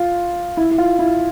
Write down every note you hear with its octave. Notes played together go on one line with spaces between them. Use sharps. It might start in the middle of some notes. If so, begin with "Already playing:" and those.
Already playing: F4
E4
E4
F4
E4